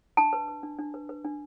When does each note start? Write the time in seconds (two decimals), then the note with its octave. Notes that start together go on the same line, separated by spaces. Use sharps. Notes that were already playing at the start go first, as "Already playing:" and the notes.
0.17 D4 A5
0.33 B4
0.48 B4
0.63 D4
0.79 D4
0.94 B4
1.09 B4
1.24 D4